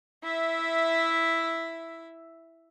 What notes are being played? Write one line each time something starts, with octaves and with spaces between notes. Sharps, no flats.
E4 E5